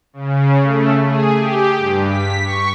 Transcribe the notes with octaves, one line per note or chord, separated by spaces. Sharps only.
C#3
A3
G#4
G4
G2
B6
C#6